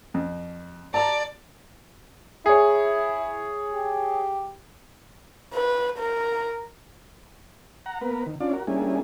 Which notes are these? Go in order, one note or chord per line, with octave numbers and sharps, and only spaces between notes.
F2
D5 A5 A#5
E4 G#4 C#5
G4
B4
A#4
F#5 A#5
A#3 B3 A#4 B4
D#3
C#4 D4 F4 D5
F#4 A#4
G3 A#3 C#4 D4 E4 G#4